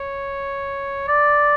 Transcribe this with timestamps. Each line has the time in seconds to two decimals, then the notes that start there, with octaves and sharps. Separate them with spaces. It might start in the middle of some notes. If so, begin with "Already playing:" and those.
Already playing: C#5
1.08 D5